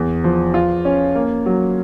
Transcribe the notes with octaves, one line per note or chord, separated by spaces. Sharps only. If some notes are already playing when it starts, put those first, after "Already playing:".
Already playing: E2
F3
F4
C#4
A#3
F#3